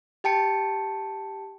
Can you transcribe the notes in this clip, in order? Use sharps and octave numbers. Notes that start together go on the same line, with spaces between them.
G4 G5 A5 C#7